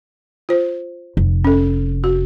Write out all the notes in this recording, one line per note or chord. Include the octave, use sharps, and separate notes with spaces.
F4 C5
F1
C#4 A4
F#4